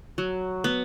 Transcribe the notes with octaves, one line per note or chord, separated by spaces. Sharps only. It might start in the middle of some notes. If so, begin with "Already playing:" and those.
F#3
B3